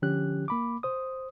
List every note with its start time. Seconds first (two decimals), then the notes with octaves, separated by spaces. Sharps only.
0.02 D3 F3 C#4 G4 F#6
0.48 A#3 B5 D6
0.83 C5 D#6